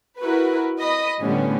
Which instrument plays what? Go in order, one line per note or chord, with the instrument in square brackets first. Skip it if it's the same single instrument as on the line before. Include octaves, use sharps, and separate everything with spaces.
[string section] E4 F#4 A#4 B4
D#5 B5 D#6
A2 D3 G3 A3 B3 C#4